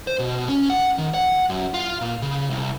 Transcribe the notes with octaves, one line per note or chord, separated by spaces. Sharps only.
C5
B2
C#4
F#5
D#3
F#5
F#2
F4
A#2
C#3
C2